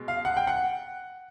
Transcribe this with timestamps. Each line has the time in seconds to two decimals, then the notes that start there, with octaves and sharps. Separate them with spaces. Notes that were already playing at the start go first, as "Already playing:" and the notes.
Already playing: B2 G#3
0.08 F5
0.25 F#5
0.37 G5
0.47 F#5